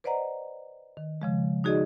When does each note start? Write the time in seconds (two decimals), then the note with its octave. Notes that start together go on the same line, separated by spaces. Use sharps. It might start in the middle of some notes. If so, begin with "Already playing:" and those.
0.04 B4 C5 D5 D#5 F#5 A#5
0.97 D#3
1.22 C#3 F3 G#3
1.64 D#4 F#4 G#4 D5 D#5